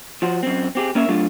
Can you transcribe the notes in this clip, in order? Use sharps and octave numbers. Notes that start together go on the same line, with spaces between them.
F3 F#4 C5
F#2 C4
C4 G4 G#4
A#3 C#4 A#4 E5
F#3 A3 D4 F4